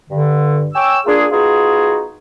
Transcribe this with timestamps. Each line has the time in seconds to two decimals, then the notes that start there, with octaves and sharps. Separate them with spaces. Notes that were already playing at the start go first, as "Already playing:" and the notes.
0.10 G2 D3
0.75 C#5 G5 G#5 D6 E6
1.06 A#3 D4 F4 G#4
1.32 B3 D#4 F4 F#4 G#4